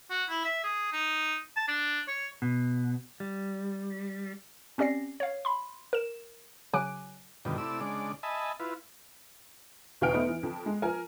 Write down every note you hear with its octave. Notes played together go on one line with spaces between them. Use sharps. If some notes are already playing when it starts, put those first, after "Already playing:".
F#4
E4
E5
G#4
D#4
A5
D4
C#5
B2
G3
C4 C#4 G4 D5 A#6 C7
C#5 F5
B5 C6
A#4 E7
C#3 F#3 G#5 D6 F#6 D7
F#2 B2 D3 D#3 F3 G3
C3 A3 E4 D5 E6
C#3 G#3 D4 D5
D#5 E5 G#5 A5 B5
E4 F4 B4
E2 B2 F5 G5 F6 D7
A3 B3 D#4 C5
E3
F2
G#3
F3 A#4 G#5